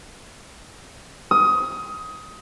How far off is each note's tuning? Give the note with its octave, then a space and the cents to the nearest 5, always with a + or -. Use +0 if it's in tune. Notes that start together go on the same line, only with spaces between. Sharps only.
D#6 +20